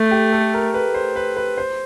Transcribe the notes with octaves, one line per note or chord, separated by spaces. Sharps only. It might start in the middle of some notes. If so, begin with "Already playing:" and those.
Already playing: A3
G4
A4
A#4
B4
C5
B4
B4
C5